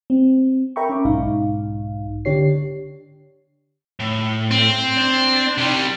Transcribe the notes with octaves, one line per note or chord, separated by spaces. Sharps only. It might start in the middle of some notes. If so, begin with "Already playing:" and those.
C4
A#4 E5 G5 A#5 B5 C#6
C#4 D6
B1 G#2 D#4 F5
D3 D4 G4 C#5 C7
A2
C4
D4
C3 G3